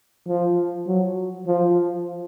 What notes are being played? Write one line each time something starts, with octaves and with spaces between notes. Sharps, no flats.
F3
F#3
F3